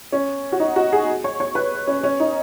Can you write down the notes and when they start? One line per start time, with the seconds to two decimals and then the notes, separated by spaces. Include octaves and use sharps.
0.12 C#4
0.52 F#4
0.60 D#4
0.76 F#4
0.93 G#4
1.24 C#5
1.40 C#5
1.55 B4
1.87 C#4
2.03 C#4
2.20 D#4